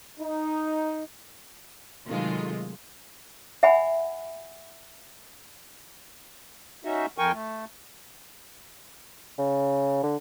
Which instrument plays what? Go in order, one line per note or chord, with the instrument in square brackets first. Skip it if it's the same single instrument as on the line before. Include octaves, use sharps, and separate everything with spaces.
[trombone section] D#4
[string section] C3 D#3 F#3 G#3 A3 F4
[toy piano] E5 F#5 G#5 B5
[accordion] C#4 D#4 F#4 E5
F2 F3 A#4 G5 G#5 C#6
A3
[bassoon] C#3
D3